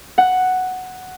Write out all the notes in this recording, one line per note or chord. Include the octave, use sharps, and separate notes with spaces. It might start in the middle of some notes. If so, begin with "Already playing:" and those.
F#5